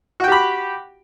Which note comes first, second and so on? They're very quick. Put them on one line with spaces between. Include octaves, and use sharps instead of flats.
F#4 G5 G4 B5